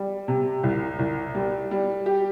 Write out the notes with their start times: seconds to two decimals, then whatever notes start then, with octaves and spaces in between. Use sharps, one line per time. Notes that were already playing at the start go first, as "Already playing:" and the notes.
Already playing: G3
0.28 C3
0.64 C2
0.99 C2
1.35 G3
1.71 G3
2.06 G4